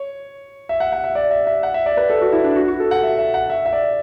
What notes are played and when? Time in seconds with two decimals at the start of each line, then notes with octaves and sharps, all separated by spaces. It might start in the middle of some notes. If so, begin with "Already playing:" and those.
Already playing: C#5
0.69 E5
0.80 F#5
0.92 F#5
1.04 E5
1.15 D5
1.31 E5
1.47 E5
1.63 F#5
1.74 E5
1.86 D5
1.97 B4
2.10 A4
2.21 F#4
2.33 E4
2.44 D4
2.56 F#4
2.68 F#4
2.80 A4
2.91 F#5
3.03 E5
3.19 E5
3.34 F#5
3.50 E5
3.66 E5
3.73 D5